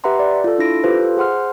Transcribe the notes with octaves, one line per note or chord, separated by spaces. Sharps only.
G4 B4 E5 F#5 A#5 C6
D5
F4 A4
D4 E4 A#6 D7
F4 G4 A4 B4 C5 F5
G#4 C5 F#5 C6 F6